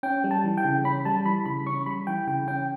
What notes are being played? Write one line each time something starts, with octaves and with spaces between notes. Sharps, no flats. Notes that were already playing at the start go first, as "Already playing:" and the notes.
C#4 G5
G3
A5
E3
G5
C#3
C#4 B5
G3 A5
E3 B5
C#3 B5
C#4 C#6
G3 B5
E3 G5
C#3 G5
C#4 G5